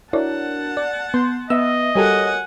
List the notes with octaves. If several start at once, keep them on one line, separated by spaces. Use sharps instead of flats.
D4 E4 F#4 A#4 C#5 D5 F#5 A5
D5
B3 C6 G6
B3 D#5 E5 E6
G3 F#4 G4 A4 A#4 C#5 F#5 G#5